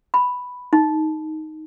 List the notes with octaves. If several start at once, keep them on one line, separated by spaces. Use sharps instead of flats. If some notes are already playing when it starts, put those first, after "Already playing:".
B5
D#4